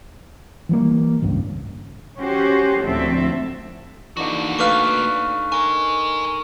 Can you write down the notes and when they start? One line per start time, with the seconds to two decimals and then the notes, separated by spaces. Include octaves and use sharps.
0.69 E3 G3 A#3
1.22 G#1 C#2 G2
2.19 C#4 F#4 G4 C5
2.84 D2 A2 F3 C4 A4 E5
4.17 D3 E3 A#3 D#4 F#4 D5
4.59 A3 B4 F5 C#6 D6 F6
5.52 A#4 D#5 G#5 C#6